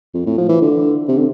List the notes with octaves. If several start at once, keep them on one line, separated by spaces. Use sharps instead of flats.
F2
A2
F3
E3
D3
C3
D3